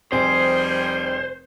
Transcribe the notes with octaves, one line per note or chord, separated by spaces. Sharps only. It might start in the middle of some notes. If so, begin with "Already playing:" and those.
F1 F3 G3 C4 G#4 C5 G#5